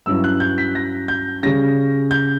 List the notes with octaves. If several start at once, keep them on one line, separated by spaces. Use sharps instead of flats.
G2 F#3 C#4 E4 E6
F#6
G6
B6
A#6
G6
C#3 G3 C#4 A#6
G6